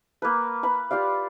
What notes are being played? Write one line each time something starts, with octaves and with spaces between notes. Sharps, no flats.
A#3 B4
B4 B5 E6
F4 G4 D5 F5